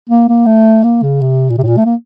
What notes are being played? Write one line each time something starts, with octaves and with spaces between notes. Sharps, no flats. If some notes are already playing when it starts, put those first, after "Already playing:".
A#3
A#3
A3
A#3
C#3
C3
A#2
C3
A2
A#2
A3
A#3